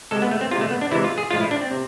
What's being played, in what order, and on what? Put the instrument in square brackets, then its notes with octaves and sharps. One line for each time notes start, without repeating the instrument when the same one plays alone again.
[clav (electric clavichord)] C3 G#3 A4
B3
A3
C4
C3 G#3 F4
A3
B3
D4
C3 E3 G#3 E4
F4
G#4
A2 F3 G#3 F4
E4
D4
C4
C3